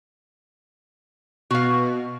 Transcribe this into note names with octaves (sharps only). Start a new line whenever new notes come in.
B2 F#4 F5